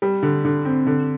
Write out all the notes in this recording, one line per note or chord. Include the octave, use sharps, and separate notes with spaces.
G3
D3
D3
C4
D3